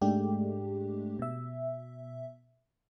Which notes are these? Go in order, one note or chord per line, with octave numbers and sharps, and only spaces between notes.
G#2 G#3 A3 D4 G4
B2 E5